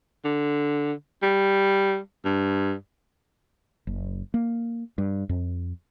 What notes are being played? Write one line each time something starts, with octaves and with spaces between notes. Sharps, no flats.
D3
G3
G2
F#1
A#3
G2
F2